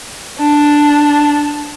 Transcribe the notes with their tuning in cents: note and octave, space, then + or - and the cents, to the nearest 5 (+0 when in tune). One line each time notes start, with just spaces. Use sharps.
D4 +0